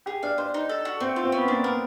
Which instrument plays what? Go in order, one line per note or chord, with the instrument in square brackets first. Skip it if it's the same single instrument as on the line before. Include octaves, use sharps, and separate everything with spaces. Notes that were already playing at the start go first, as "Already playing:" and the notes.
[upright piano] G4 [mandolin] G#4
[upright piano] D4 [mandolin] F5
[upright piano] D4 [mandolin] C5
[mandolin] D#4
A4
F#4
[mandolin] A3 [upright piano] C4
[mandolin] F4
[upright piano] C4
[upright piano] B3 [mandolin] C#4
[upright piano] A#3 [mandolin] D4
[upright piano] B3 [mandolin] A#4